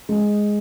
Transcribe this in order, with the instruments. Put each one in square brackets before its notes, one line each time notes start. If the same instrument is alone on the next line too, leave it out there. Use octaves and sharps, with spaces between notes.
[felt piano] G#3